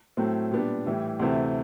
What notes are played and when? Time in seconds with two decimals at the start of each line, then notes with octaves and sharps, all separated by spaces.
0.17 A2 F#3 A3 C4
0.51 A#2 G3 B3 D4
0.86 A2 E3 G3
1.20 D2 C3 E3 A3 C4